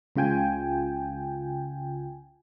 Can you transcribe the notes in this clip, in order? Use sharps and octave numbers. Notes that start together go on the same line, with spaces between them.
C#2 C#3 F4 G5 G#5